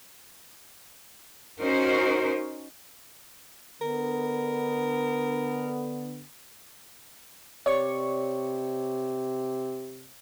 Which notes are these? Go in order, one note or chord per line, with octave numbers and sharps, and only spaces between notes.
C#4 D#4 F#4 A#4 C5
D3 B3 A#4
C3 C#5 D5 C#6